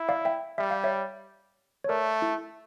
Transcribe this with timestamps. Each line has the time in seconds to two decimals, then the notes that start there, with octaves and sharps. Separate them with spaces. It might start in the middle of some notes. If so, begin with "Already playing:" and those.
Already playing: E4
0.09 D5 F5
0.25 E5 G5
0.58 G3 E5
0.71 F5
0.84 C#5 E5
1.84 C#5
1.89 A3 A#4 D5
2.22 E4